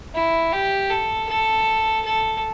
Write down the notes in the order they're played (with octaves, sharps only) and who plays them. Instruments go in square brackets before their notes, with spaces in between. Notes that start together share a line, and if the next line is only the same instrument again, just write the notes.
[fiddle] E4
G4
A4
A4
A4